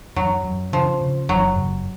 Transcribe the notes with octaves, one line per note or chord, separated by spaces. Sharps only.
F#2 F#3
F#2
C#3 F3
C#3
F#1 F#3
F#1